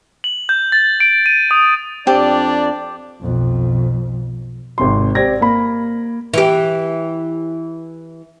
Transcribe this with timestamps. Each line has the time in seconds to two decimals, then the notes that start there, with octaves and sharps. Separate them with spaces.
0.24 F#7
0.49 G6
0.72 A6
1.00 D7
1.26 D#7
1.51 D#6
2.07 F2 C4 D4 G4 D5
3.21 B1 F2
4.78 G#1 C3 C6
5.15 C4 G4 D5 G#6 A#6
5.41 A#3 B5
6.34 E3 G4